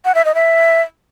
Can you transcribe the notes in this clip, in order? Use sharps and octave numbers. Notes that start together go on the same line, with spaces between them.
F#5
E5
D#5
E5